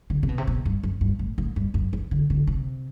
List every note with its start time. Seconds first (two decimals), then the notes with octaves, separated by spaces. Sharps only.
0.10 D3
0.23 C3
0.29 B2
0.38 C3
0.47 B2
0.65 G2
0.83 F#2
1.01 G2
1.19 A2
1.38 A2
1.56 G2
1.74 F#2
1.93 E3
2.11 D3
2.30 D3
2.47 C3